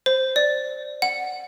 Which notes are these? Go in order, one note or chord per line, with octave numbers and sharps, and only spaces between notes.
C5
D5
F#5